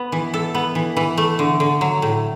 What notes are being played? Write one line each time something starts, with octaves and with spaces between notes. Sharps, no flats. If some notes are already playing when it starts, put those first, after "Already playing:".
Already playing: B3
E3
A4
B3
E3
E3
A3
D3
D3
F#3
A2